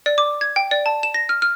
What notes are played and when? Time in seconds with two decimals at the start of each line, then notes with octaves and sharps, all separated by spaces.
0.06 D5
0.18 D6
0.41 G#6
0.56 G5
0.71 D5
0.86 A5
1.03 E7
1.14 A#6
1.29 F6
1.42 F6